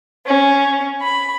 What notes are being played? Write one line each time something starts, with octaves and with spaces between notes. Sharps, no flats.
C#4
B5